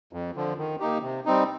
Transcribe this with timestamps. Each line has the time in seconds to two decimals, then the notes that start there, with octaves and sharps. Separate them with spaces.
0.13 F2
0.36 D3 F3
0.58 D#3
0.80 A#3 D#4 G4
1.02 C3
1.26 G3 C4 D#4